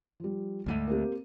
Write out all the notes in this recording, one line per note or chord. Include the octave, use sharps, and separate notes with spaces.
F3 G3
D2 G#2 G#3 A3 D#7
A#3 C4 G4